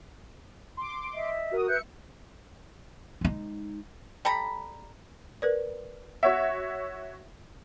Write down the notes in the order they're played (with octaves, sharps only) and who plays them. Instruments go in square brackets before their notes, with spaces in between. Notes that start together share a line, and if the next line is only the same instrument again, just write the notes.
[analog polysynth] C6 D6
[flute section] D#5 E5
[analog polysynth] F#4 A#4 D#6
[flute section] B4 F#6 G6 [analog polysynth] E5 C#7
[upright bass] G#3 D#4
[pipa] G3 A4 A#5 B5
[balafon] A#4 B4 D5
[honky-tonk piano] F#4 C#5 E5 [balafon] F#5